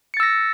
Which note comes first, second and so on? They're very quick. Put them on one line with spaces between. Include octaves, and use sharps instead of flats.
C#7 A6 E6 A#6